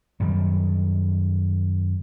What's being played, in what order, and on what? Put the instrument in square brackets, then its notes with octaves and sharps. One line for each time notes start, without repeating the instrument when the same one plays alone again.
[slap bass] F#2 D#3 G3